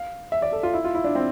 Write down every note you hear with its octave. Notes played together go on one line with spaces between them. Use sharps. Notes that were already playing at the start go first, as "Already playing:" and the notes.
Already playing: F5
E5
D5
A4
F4
E4
F4
E4
D4
C4